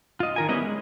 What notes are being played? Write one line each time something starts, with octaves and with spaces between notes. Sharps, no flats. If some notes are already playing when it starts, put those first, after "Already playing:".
F4 D#5
D#3 A#4 G#5
G3 B3 C#4 E4 D#5
G#3